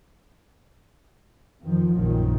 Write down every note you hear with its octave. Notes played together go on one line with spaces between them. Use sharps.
F2 D#3 F3
A#1 F#2 D#3 F3